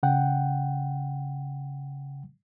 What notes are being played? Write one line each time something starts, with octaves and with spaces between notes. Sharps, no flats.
C#3 F#5 G5